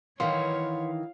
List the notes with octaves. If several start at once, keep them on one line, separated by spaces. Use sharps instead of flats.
D#3 E3 B4 C#5 F5 F#5 C6